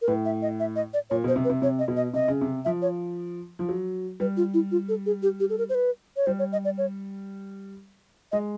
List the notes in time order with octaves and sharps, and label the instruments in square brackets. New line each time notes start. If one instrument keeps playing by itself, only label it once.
[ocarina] A#4
[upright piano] A2 [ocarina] B4
[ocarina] E5
D#5
E5
D#5
D5
[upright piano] A#2 [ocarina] C#5
[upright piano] B2 [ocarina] C5
[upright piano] C3
[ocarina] B4
[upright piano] C3
[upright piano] C3 [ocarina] C#5
[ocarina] D#5
[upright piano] B2
[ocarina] D#5
[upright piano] C3 [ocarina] D#5
[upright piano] C#3
C3
[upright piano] F3 [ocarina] E5
[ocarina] C#5
[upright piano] F3
F#3
[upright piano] G3 [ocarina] B4
[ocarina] F4
E4
F4
A4
G#4
G4
G4
A4
A#4
C5
B4
C#5
[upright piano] G3 [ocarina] C5
[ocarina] C#5
D#5
D5
C#5
[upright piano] G#3 [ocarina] D#5